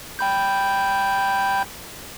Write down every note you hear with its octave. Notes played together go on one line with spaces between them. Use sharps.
G5 B5 G6